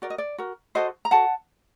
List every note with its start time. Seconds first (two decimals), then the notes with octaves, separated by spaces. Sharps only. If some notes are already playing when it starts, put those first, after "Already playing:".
0.02 F#4 A#4 D5
0.10 D#5
0.18 D5
0.38 F#4 A#4
0.75 F#4 A4 C5 D#5
1.05 A#5
1.11 F#4 A4 F#5 A5